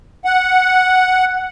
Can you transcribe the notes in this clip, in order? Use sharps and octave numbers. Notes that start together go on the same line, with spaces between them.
F#5